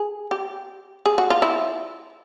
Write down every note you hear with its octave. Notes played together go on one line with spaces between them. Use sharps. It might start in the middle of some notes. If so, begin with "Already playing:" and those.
Already playing: G#4
G4
G#4
F#4
F4
E4